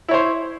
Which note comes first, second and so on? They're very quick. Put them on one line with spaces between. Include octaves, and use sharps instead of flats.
E4 C#5 C5